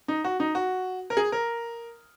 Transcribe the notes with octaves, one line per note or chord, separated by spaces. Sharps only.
D#4
F#4
D#4
F#4
A#4
G#4
A#4